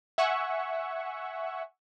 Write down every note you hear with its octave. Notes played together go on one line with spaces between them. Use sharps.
E5 F#5 G#5 C#6